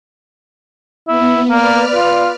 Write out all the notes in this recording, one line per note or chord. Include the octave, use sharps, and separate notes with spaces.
B3 E4
A#3 B4 D5 F6
F4